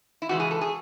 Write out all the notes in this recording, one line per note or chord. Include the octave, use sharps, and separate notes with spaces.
E4
C#3 E3 G#3 F#4
G#4
A4
G#4